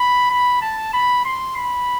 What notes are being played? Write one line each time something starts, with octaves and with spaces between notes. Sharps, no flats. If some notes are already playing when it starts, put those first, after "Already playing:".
Already playing: B5
B5
A5
B5
C6
B5